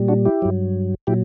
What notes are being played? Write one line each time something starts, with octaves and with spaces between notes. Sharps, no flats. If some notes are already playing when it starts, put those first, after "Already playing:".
Already playing: A#2 G3
D4 F#4
E4 G4
G2 F#3
A#2 F#3 E4 G4